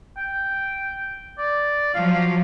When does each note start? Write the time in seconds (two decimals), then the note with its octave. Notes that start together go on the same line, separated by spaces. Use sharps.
0.17 G5
1.38 D5
1.94 F3 F#3 F5